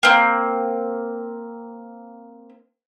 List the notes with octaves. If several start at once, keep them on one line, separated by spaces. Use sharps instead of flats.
A#3 C4